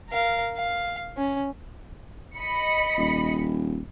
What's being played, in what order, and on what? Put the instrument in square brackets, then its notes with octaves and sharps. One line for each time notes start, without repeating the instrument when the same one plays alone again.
[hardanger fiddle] A#4 F5
F5
C#4
[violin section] D#5 B5 C#7
[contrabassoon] D#1